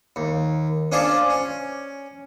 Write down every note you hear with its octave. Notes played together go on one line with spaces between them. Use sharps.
D#2
C#4 D4 F4 G#4 C5 D5
C#4